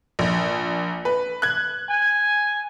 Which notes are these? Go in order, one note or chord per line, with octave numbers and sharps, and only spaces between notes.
A#1
B4
F#6 G#6
G#5